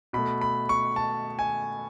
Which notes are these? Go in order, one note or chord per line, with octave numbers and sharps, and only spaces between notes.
B2 A3 B5
B5
C#6
A5
G#5